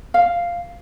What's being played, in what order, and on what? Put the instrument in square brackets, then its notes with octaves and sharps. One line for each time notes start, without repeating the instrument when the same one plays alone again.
[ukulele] F5